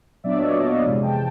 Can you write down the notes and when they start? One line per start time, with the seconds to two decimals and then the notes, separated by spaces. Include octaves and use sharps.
0.24 A#2 F#3 B3 D4 D5 E5
0.39 C#5 D#5
0.53 D5 E5
0.68 D#5 F5
0.84 F2 C3 E3 G#3
1.03 G5 A5